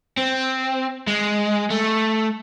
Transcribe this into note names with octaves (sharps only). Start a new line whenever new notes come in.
C4
G#3
A3